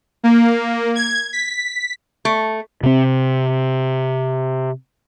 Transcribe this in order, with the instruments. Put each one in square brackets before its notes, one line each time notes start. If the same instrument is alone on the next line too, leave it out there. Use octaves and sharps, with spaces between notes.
[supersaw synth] A#3
G#6
B6
[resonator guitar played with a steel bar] A3
[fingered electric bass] C3 C4